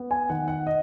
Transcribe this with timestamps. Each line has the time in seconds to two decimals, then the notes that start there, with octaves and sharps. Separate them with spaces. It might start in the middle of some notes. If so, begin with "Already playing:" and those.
Already playing: B3
0.11 G#5
0.30 D#3 F#5
0.48 F#5
0.67 D#5